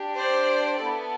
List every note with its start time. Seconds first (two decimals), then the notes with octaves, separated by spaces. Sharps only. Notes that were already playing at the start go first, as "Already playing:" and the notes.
Already playing: D4 G4
0.16 C5 D5
0.79 B3 E4 A4